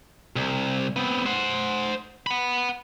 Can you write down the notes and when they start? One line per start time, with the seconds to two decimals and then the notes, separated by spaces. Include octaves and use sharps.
0.36 C2
0.96 B3 C4
1.26 C5 F#5
2.27 F#5 B5